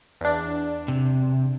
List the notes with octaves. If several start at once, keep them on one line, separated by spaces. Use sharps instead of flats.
E2 D4
C3